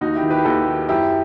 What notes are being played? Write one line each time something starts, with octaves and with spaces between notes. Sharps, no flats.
D#2 D#4 F#4
E4 G4
D#3
G4 B4
D#2 F#4 A4
D#3
F#2 E4 G4